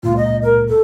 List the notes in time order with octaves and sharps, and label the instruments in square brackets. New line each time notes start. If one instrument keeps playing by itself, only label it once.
[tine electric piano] C#2 A#2 [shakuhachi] F4
[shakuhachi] D#5
A#4
A4